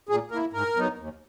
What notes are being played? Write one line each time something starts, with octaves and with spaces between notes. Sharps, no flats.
A#2 G#4
A#3 E4 A#4
G#2 A#4
F#3 B3 D#4
D#2